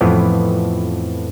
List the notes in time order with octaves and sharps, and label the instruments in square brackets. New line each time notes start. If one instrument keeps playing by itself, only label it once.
[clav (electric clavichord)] F2 A2 E3 F3 B3